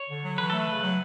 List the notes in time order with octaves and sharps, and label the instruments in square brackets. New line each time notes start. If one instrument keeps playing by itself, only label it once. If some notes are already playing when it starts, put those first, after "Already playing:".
Already playing: [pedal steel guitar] C#5
[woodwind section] D3
F#3
[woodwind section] E3 [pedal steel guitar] B4
[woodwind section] A3 [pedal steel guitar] A4
[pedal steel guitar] B4
[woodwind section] C#3
F#3